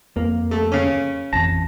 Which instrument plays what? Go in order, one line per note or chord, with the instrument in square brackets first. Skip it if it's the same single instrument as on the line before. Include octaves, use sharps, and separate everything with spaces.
[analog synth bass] F2 [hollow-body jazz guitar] A#3
[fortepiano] A3
C#3 C#4
[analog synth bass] A1 [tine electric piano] F2 A#6 [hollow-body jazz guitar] A5